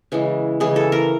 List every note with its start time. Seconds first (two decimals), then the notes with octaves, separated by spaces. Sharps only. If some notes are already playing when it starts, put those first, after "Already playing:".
0.12 C#3 E3 G#3
0.60 C#3 E3 G#3 G#4
0.76 A4
0.92 A#4